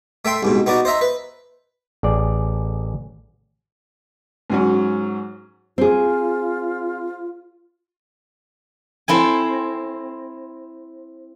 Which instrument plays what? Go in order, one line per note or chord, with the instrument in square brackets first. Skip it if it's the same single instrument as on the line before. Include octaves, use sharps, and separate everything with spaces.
[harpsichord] A3 E5 G5 C6
C2 G#2 B2
B3 D#4 F#4 D5
C5 D#5 E5 A#5
B4
[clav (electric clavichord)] A1 G#4 D5
[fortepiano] G#2 F#3 C#4
[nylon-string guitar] C4 G#4 [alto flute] F4
[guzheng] C4 E4 A4 G#5